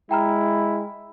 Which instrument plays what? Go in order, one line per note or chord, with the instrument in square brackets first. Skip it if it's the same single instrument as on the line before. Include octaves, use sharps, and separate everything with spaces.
[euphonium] G#3 [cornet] E4 [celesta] G5 A#5 F6